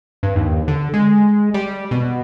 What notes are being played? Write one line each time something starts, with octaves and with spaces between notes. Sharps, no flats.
G2
D#2
D3
G#3
G3
B2